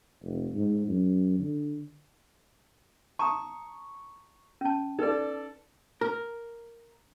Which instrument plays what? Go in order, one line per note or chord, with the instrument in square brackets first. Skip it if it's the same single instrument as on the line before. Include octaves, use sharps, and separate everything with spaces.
[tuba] F1
G#2
F#2
D3
[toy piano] A5 A#5 D#6 [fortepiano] C#6
[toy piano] C#4 A5
[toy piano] D#4 B4 [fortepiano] A4 D5
[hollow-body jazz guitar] A#4